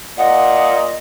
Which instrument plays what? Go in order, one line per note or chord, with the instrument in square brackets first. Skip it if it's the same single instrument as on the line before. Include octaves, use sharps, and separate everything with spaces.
[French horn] A#2 [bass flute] D#5 [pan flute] F#5